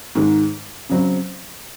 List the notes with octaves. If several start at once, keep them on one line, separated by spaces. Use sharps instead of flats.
G#2 D#3 G#3
C#3 F#3 C4